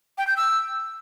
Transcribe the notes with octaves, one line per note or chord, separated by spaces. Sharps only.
G5
G6
E6